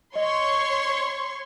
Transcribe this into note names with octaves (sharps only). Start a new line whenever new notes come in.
C#5 D#5 C6 C#6